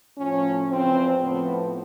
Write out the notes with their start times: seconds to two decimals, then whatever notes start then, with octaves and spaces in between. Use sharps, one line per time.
0.17 A2 F3 C#4
0.69 E2 C#3 F3 C4
1.22 A2 F3 B3